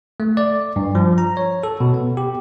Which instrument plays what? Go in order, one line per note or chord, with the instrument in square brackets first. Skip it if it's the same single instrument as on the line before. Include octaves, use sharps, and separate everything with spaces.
[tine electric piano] A3
D5
G2
F3
A#5
C#5
A4
B2
B3
G4